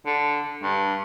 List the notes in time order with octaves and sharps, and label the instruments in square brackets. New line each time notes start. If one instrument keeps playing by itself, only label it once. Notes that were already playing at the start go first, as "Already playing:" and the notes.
[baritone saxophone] D3
G2